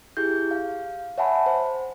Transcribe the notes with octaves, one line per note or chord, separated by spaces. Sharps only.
E4 G4 G#4 G6
F5
C#5 E5 F#5 G#5 A5 B5
C5